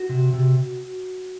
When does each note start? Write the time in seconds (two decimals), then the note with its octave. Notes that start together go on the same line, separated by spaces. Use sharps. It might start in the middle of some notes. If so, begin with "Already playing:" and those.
Already playing: F#4
0.09 C3
0.33 C3